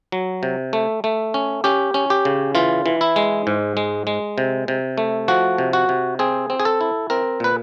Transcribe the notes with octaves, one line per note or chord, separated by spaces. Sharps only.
F#3
C3
A3
A3
C#4
C#4 G4
C#4
G4
C#3
E3 F4
E3
E4
G#3
G#2
G#3
G#3
C3
C3
A3
F3 F#4
C3
F#4
C3
C4 G#4
C4
G#4
A4
E4
C4 A#4
A#2 B4